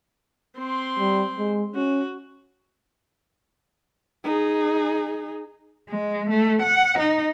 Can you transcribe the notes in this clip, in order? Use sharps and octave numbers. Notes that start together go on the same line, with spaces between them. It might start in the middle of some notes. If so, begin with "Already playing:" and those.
C4 C6
G3
G#3
C#4 F#4
D#4 G#4
G#3
A3
F#5
D#4